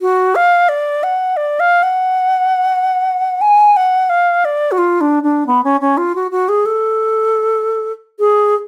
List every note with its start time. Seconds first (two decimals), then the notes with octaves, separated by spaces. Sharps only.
0.01 F#4
0.35 F5
0.69 D5
1.03 F#5
1.37 D5
1.60 F5
1.83 F#5
3.41 G#5
3.76 F#5
4.09 F5
4.45 D5
4.71 F#4
4.78 F4
5.01 D4
5.23 D4
5.47 B3
5.64 C#4
5.81 C#4
5.97 F4
6.15 F#4
6.31 F#4
6.49 G#4
6.66 A4
8.19 G#4